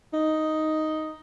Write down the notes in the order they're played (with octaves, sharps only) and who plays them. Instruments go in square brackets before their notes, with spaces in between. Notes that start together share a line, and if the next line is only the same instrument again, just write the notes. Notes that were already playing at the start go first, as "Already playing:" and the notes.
[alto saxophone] D#4